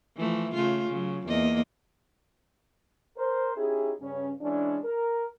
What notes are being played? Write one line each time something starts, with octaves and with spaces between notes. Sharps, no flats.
E3 F3 A3
C#3 A3 F4
C#3 F#3
E2 A#3 D#5
A#4 C5
C#4 D#4 E4 G4 G#4
G2 C#3 C#4
E3 G#3 C#4 D4
A#4